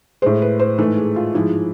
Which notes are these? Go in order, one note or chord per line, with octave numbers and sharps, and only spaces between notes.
A2 G#3 C5
B4
C5
G#2 E3 A3 B4
G#4
F4
G#2 F3 G#3 E4